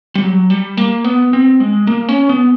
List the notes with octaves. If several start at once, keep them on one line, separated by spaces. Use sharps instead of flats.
G3
F#3
G3
A#3
B3
C4
G#3
A#3
C#4
B3